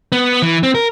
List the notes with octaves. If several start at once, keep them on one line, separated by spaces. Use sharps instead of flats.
B3
E3
C4
A#4